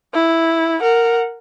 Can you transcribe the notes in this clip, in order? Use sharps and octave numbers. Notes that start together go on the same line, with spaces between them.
E4
A#4 F#5